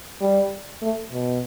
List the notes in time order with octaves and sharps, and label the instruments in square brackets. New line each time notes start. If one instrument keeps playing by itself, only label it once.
[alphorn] G3
A3
B2